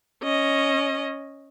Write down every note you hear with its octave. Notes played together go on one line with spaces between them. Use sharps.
C#4 D#5